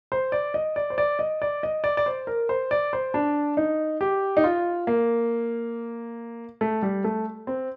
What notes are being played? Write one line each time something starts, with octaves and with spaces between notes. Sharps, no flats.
C5
D5
D#5
D5
C5
D5
D#5
D5
D#5
D5
D5
C5
A#4
C5
D5
C5
D4
D#4
G4
D#4
F4
A#3
A3
G3
A3
C4